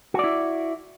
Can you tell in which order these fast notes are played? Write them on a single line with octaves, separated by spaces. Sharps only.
F#4 D5 E4